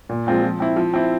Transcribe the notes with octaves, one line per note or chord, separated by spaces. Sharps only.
A#2
F3 G#3 C4 F4
F3
C4 E4
F3
C4 E4